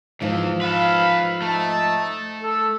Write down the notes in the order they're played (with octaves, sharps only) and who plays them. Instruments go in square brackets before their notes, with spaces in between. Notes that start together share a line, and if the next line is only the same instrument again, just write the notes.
[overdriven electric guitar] E2 E3 [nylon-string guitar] G#2 F3
[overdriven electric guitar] A4 B4 [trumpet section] F5 B5
[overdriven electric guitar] A3 [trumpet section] D#4 E5 A5
[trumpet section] A4